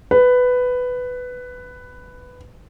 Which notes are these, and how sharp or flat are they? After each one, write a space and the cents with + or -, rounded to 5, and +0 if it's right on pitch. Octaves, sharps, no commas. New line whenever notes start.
B4 +10